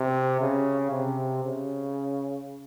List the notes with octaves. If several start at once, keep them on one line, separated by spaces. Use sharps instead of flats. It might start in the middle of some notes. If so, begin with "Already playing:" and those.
Already playing: C3
C#3
C3
C#3